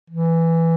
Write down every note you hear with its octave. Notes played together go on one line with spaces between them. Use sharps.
E3